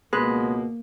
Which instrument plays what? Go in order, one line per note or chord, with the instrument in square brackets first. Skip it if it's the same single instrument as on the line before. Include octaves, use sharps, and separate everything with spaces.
[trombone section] C#2 B2 [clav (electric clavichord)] G#3 [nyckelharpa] A#3 [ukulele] B4